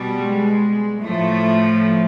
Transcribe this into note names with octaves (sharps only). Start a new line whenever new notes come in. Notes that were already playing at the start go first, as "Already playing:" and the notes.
Already playing: B2 G3
G#3
A2 F3 A3